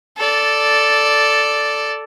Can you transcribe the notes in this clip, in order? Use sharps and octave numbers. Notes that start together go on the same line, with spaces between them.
A4 D5